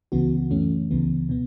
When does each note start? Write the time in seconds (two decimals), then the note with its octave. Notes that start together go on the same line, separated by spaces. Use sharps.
0.12 C#2 C#3 E3 B3 F#4
0.51 F#2 E3 A3 C#4
0.91 C#2 C#3 E3 B3
1.29 B2 B3